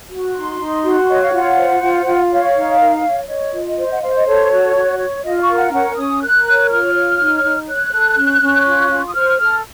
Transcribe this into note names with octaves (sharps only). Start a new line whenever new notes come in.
F#4
D#4 C6
D#4
F#4
C#5 D#5
F5
F4 F#5
C5
F4
F4
C#5 F5
D#4
A#4
C#5
C#5 D#5
F4
C5
F#5
C5 F5
D#5
A4 C#5
F#4
F#4
C#5
F4 D#5
C#6
A#4
F#5
C#4 F#5
C#4 D#6
A#4 F#6
C#5
F4 F6
C#5
D#4
D#4
C#5 F#6
A4
C#4
C#4
F4
F4
D#6
C5 F6
A4